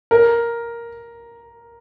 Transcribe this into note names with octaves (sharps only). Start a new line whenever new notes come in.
A#4